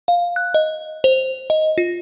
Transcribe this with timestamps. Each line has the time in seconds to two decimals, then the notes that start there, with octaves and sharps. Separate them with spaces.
0.08 F5
0.36 F#6
0.54 D#5
1.04 C5
1.50 D#5
1.78 F4